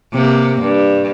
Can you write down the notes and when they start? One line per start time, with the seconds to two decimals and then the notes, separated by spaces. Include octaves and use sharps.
0.13 C3 A#3
0.62 G2